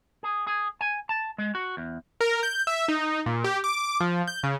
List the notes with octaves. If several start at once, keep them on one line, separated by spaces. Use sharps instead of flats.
G#4
G#4
G#5
A5
G#3
F#4
E2
A#4
G6
E5
D#4
A#2
G4
D6
F3
G6
C#3